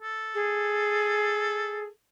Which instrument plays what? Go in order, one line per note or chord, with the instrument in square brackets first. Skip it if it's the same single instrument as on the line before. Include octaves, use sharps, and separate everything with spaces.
[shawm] A4
[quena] G#4